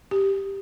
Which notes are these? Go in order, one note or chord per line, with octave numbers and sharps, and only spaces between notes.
G4